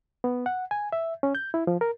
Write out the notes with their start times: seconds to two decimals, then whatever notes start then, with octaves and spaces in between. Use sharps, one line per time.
0.24 B3
0.46 F#5
0.71 G#5
0.92 E5
1.23 C#4
1.35 G6
1.54 E4
1.67 F3
1.81 A#4